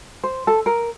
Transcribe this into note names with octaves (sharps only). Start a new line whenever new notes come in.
C5
A4
A#4